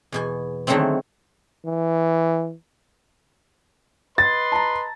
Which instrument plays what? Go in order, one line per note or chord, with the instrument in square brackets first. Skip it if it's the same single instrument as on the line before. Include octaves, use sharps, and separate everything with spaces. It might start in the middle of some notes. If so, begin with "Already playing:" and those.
[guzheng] E2 B2 G#5
D3 D#3 F#3 G#3 A3 C4
[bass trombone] E3
[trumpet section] B4 D#5 C6 [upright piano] A6
[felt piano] A5 A#5